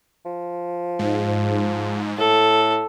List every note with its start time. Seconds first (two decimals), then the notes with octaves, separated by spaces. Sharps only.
0.26 F3
0.99 G#2
2.18 A2 A4